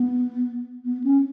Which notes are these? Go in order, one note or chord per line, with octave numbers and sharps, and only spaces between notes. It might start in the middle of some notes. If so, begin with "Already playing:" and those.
Already playing: B3
B3
C#4